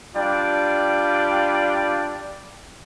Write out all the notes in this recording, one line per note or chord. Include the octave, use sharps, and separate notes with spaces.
G3 D4 F4 D5 G5